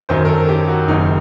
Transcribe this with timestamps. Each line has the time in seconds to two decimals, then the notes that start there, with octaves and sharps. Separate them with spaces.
0.09 F#2 D#3 F#3 C5
0.25 A#4
0.28 A4
0.49 G4
0.68 F#4
0.88 F#1 F#2 D#3 D#4